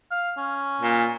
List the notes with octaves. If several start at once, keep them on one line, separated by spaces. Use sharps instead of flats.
F5
C#4
A#2